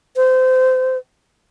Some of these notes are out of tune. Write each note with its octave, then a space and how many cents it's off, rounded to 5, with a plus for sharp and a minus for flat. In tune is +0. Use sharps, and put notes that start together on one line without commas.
C5 -25